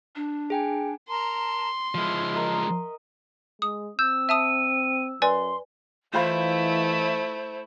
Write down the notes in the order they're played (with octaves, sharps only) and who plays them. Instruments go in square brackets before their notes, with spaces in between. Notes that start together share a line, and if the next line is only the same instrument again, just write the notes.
[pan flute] D4
[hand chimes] G#4 G5 G#5
[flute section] A#4 A5 A#5 [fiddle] C6
[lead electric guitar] F3 G#3 [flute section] E4 F6
[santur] A#4 D#5 E5
[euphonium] G#3 [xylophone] D#6
[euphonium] C4 [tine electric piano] E6 [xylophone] G6
[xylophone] E5 A5 D#6 [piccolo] D#7
[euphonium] F#2 [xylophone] B4 D5 G#5 [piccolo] C6
[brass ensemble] E3 D#5 [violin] A3 E4 [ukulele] F4 F5 B5 [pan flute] C5